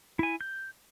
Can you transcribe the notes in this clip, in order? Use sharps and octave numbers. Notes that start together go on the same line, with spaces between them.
E4 G#5
G6